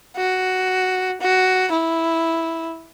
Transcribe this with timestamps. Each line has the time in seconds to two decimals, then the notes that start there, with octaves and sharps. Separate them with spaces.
0.17 F#4
1.21 F#4
1.72 E4